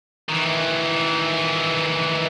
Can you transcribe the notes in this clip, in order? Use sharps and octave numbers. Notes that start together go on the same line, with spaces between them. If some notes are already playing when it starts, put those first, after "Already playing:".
D#3 E3